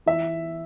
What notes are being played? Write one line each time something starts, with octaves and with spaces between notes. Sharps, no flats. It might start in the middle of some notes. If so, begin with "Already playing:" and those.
E3 E5